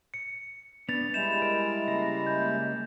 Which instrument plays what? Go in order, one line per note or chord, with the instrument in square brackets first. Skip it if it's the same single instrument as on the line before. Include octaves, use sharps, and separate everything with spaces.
[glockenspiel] C#7
[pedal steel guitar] B3 D4 [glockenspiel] A6 F7
[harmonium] G3 G#3 E4 [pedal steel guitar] G6 [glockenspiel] E7 F7
[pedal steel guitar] A#4
C#3 A#3 A#5
[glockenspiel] G6